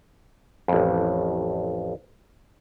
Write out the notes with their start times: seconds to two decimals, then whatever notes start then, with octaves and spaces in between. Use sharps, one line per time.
0.68 A1 F2